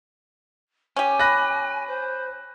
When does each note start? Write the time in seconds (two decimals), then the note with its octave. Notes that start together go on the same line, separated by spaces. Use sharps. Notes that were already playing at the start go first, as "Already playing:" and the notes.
0.97 C#4 G4 G#5
1.19 B5 F#6 A#6
1.87 C5